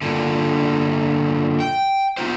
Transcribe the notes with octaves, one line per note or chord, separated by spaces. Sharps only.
G2 A#2 D3
G5
B3 D#4 F4 C5